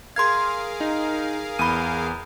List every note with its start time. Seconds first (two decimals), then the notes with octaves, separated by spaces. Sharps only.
0.16 G#4 A#4 F5 C6 G#6
0.81 D#4
1.59 E2 B5 D#7